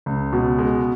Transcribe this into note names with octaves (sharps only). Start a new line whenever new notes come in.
C#2
B2
G#3